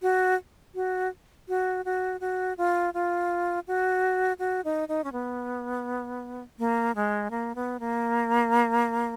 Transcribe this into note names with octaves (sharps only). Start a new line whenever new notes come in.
F#4
F#4
F#4
F#4
F#4
F4
F4
F#4
F#4
D#4
D#4
C#4
B3
A#3
G#3
A#3
B3
A#3